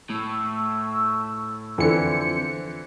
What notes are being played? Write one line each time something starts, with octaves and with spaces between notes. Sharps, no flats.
A2 A5 C#6 E6
F2 D3 E3 F4 C5 C#7